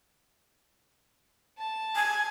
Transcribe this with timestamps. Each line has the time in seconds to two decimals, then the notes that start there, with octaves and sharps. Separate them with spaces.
1.58 A5
1.96 G#5